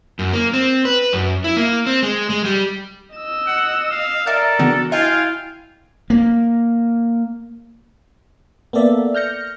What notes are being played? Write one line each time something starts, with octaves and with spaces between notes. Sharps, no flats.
F#2
A#3
C4
B4
F#2
E4
A#3
C4
G#3
G#3
G3
D#5 E6
F#5
F5
A4 A#4 D5 E5 F6
C#3 E3 B3 D4 F#4
E4 F4 D#5 F5 G5 G#5
A#3
A#3 B3 A4 D5 E5
F6 G6 A#6 C#7